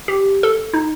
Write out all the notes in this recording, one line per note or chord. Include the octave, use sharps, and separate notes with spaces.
G4
A4
D#4